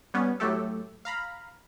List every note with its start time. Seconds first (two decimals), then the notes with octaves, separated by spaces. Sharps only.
0.14 G3 B3 C#4
0.40 A2 F#3 A3 G4 A4
1.05 F5 A#5 B5